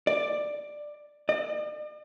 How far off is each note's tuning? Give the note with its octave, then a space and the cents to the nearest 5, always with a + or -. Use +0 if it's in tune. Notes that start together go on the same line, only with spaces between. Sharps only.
D5 +10
D5 +45